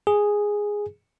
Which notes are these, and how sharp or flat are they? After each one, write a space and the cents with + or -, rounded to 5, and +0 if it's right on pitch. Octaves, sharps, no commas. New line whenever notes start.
G#4 -5